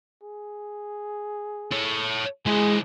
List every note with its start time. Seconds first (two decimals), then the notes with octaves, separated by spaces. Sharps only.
0.23 G#4
1.72 A4 C#5
2.46 E3 G#3 G#4 C5